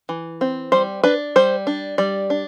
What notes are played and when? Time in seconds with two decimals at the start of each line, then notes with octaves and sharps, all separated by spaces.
0.09 E3
0.41 C4
0.72 G3 C5
1.03 D4 B4
1.36 G3 C5
1.67 D4
1.98 G3 D5
2.30 D4